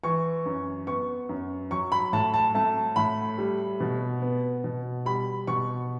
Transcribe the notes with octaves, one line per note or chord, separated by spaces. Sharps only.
E3 C#6
F#2
B3 C#6
F#2
F#3 C#6
B5
A2 A5
A5
A3 A5
A2 B5
G3
B2
B3
B2
G3 B5
B2 C#6